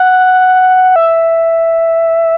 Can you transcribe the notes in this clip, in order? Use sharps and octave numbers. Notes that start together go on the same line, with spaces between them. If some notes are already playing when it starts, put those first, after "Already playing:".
Already playing: F#5
E5